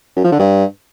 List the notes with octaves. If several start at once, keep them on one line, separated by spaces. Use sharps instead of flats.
F#2
F3
D3
G2